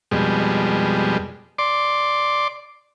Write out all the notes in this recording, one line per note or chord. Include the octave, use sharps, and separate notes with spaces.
F2 B2 G3 G#3
D5 C6 D6